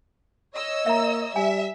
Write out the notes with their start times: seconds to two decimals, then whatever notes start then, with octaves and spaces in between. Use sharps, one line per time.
0.54 C#5 D#5 E6
0.86 A#3 E5 A#5
1.36 G3 E5 G#5